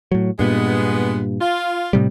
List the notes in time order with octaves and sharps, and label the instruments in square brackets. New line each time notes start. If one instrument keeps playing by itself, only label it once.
[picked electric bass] A2 F#3
[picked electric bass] G2 A#2 [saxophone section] G#3 B3
[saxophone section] F4
[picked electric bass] A2 C3 G3